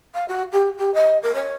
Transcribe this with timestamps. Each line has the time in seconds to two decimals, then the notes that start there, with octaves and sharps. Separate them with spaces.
0.14 F5
0.28 F#4
0.52 G4
0.78 G4
0.94 D#5
1.23 A#4
1.35 C#5